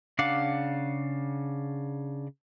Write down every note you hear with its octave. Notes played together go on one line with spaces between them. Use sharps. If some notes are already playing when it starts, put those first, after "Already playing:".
C#3 D4 F5 F#5 D6